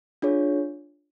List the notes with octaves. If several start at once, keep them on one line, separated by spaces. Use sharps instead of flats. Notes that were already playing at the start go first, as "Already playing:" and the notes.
D4 F4 G#4 C#5